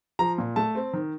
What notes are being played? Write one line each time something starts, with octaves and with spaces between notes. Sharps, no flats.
F3 A#5
A#2
A3 A5
C4
D#3